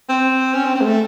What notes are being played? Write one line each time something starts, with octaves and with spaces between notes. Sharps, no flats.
C4
C#4
C4
C4
G#3
A3